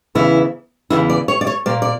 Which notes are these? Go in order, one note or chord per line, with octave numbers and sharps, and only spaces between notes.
E2 C#3 E3 B3 E4
E2 C#3 E3 B3 E4
D5
C#5
D5
C#5
A#2 A#3 D5
D5